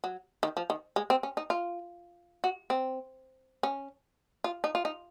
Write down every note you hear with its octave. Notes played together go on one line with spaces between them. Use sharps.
F#3
D#3
F3
D#3
G#3
C4
C#4
D#4
F4
F#4
C4
C#4
F4
D#4
F4
D#4